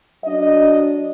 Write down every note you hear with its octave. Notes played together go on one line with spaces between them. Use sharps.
F#3 D4 D#5